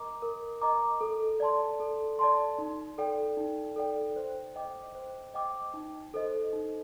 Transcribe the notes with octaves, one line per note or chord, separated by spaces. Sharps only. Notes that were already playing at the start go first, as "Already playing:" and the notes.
Already playing: A#4 D#5 A#5 D6
A#4
D#5 A#5 D6
A4
D5 A5 C6
A4
D5 A5 C6
D#4
A4 D5 G5
D#4
A4 D5 G5
C5
D#5 G5 D6
C5
D#5 G5 D6
D#4
A4 C5 D#5
D#4